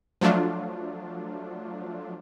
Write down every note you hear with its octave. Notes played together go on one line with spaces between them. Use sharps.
F3 F#3 A3 D4 F4